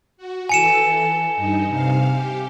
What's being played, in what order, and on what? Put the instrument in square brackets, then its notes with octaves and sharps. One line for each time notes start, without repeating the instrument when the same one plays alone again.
[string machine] F#4
[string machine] E3 A4 [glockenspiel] G#5 C#7 E7
[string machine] G2 D#4
C3 F5
G4